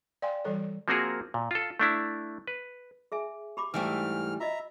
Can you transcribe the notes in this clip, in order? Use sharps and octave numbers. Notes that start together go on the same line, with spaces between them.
D5 F5 G5 G#5 C6
E3 G3 A4 C#5
F3 A#3 C4 F#4 G#4 A#4
A#2
F4 A4
A3 D4 E4
B4
G#4 E5 G#5
G4 B5 D6
G#2 E3 G3 A3 E6 F6
F4 D#5 E5 A#5